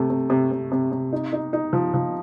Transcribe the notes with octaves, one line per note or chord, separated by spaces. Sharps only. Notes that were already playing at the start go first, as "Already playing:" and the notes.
Already playing: C3 A3
C3
C3
C3
C3
C3
D#4
D#4
D#4
F3
F3